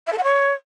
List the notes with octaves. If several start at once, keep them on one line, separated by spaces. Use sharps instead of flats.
E5
A4
F#5
C#5